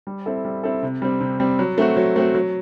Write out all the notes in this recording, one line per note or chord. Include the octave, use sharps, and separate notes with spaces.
G3
C4 E4 A4
G3
C4 E4 A4
C3
G3 C4
C3
G3 C4
F#3
A3 C4 F#4
F#3
A3 C4 F#4
F#3